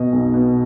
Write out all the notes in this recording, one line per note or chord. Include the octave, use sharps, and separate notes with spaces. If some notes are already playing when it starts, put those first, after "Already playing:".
Already playing: B2 D#5
B1
B2